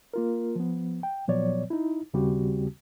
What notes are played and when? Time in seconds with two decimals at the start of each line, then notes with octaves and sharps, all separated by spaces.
0.14 A#3 F4 A#4
0.56 F3 B3
1.03 G5
1.28 A#2 F3 F#3 B3 C#5 D5
1.70 D#4 E4
2.14 D#2 C#3 G3 C4 F#4 G4